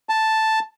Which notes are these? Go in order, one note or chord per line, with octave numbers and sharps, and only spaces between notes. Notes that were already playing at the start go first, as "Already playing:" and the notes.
A5